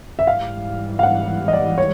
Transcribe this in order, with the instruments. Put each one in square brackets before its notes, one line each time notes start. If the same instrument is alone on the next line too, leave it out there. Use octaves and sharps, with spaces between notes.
[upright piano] E5
[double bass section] G#2 E3 G3 [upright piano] F5
[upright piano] F5
F#5
D#5
D5
C#5